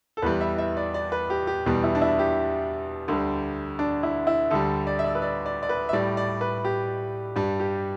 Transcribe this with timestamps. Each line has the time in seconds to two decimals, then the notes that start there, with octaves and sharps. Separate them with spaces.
0.17 A4
0.22 E2 E3 G3 B4
0.41 E5
0.58 E5
0.77 D5
0.94 D5
1.12 B4
1.30 G4
1.47 G4
1.66 E2 B2 G3
1.84 E4
1.95 D4
2.01 E4
2.19 G4
3.08 D2 D3 G3
3.79 D4
4.03 E4
4.27 E4
4.50 D2 D3 G3 A4
4.87 D5
4.99 E5
5.04 D5
5.15 B4
5.22 D5
5.46 D5
5.63 D5
5.69 B4
5.89 E5
5.93 A2 G3 D5
6.17 D5
6.41 B4
6.65 G4
7.36 G2 G3
7.60 G4